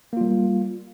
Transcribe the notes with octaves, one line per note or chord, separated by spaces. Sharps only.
G3 A#3 F4